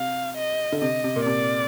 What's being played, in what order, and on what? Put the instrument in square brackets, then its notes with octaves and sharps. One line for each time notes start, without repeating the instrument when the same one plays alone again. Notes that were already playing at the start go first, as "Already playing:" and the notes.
Already playing: [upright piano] C3 [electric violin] F5
[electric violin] D#5
[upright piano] D3
[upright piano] C3 [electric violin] D#5
[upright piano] C3
A#2
[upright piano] C3 [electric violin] D5